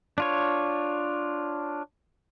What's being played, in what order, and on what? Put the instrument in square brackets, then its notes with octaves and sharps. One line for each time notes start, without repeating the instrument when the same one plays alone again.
[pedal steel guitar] D4 F4 C#5